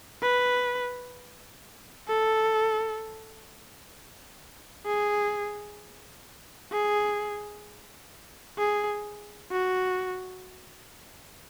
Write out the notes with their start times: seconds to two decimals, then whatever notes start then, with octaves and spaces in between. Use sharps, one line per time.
0.22 B4
2.08 A4
4.86 G#4
6.72 G#4
8.58 G#4
9.51 F#4